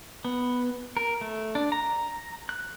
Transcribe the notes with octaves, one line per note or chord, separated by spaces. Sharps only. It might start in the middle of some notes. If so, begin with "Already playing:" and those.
B3
A#4
A3
D4
A#5
F#6